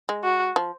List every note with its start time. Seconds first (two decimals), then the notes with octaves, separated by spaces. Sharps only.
0.09 G#3
0.24 F#4
0.56 F3